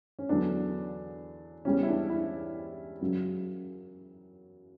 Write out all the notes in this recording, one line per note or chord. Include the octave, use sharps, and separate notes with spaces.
C#4
E2 D3 F#3 D4
E2 C#3 G3 C#4
E4
D4
E4
F#2 C#3 F#3